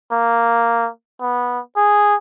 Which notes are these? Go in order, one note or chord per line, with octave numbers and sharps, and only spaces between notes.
A#3
B3
G#4